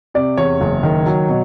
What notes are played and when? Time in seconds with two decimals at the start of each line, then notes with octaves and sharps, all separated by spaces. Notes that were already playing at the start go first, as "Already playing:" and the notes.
0.14 C3 D5
0.37 E2 C#5
0.61 F#1
0.83 D#3
1.06 F#3
1.29 B2